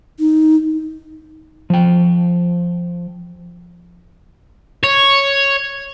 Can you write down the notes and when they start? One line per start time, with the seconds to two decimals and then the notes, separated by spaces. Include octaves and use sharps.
0.19 D#4
1.70 F3 G5
4.84 C#5